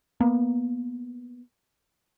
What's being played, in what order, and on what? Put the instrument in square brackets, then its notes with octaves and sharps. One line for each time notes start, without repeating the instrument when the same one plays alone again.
[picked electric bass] A#3 B3